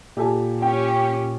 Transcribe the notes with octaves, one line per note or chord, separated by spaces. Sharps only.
A#2 G4 A4 G#5
C#4 G4 G5